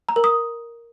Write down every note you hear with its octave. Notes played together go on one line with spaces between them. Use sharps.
A#5
A#4
D#6